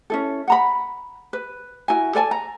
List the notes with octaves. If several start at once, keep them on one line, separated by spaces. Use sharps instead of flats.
C#4 E4 A4
F#5 A#5 B5
B4
E4 F#4 A#4 G#5
A4 D5 G#5 A5
A#5